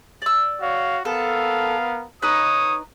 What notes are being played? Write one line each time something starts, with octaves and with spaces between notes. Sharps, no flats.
D5 E6
F#4 C#5 F5
B3 A4 A#4 F5
D#4 B4 C#5 D#6